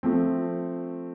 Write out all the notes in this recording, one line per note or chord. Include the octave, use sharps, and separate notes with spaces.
F3 A3 C4